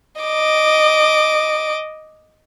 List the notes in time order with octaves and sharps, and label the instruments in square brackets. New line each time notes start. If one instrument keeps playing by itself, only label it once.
[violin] D#5 D6